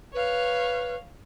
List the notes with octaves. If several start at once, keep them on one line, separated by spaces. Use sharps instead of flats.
B4 C#5 F5